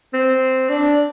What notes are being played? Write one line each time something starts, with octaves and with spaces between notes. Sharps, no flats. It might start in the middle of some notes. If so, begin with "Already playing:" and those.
C4
D4